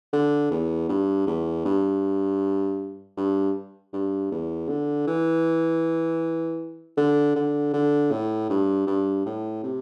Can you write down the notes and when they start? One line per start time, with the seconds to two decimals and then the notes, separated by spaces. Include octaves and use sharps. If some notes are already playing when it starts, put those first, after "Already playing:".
0.13 D3
0.51 E2
0.89 G2
1.27 E2
1.65 G2
3.17 G2
3.93 G2
4.31 E2
4.68 D3
5.07 E3
6.97 D3
7.36 D3
7.73 D3
8.11 A2
8.50 G2
8.87 G2
9.26 A2
9.63 C3